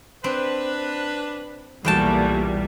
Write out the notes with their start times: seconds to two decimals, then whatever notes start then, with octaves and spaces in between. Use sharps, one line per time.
0.24 C4 D4 B4
1.85 B1 E2 A#2 G3 A3 F#4 G5 A5